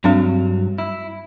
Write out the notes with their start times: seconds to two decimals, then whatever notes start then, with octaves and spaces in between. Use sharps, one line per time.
0.04 G2 F#3 G3 C4 D4
0.78 E4